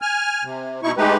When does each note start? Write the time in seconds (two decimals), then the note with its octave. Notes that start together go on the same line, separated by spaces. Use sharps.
0.02 G#5 F6
0.44 C3
0.83 B2 D#4 E4 C#6
0.97 G#3 A3 D#4 G4 B4